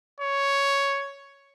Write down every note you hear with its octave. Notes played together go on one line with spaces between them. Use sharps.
C#5